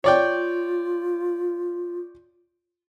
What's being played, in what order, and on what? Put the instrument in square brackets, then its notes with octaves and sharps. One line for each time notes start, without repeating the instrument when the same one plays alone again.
[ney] F4 [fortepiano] C#5 D5 G5